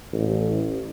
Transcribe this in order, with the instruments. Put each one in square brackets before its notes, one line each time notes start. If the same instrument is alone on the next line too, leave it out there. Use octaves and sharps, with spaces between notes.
[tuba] A1